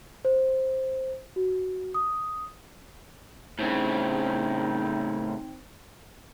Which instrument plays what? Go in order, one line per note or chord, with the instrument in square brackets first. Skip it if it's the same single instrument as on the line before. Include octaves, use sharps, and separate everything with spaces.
[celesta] C5
F#4
D#6
[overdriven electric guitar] A2 C#3 [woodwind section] C4 D#4